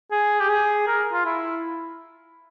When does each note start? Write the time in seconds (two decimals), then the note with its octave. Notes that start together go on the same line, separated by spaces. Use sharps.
0.11 G#4
0.40 G4
0.49 G#4
0.87 A#4
1.12 F4
1.25 E4